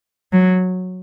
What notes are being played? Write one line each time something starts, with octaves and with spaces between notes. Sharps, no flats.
F#3